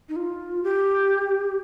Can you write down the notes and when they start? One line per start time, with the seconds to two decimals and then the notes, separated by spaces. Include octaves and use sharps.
0.09 D#4
0.16 F4
0.63 G4